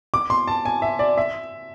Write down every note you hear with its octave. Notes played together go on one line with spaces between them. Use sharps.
D6
C6
A5
G#5
E5
D5
E5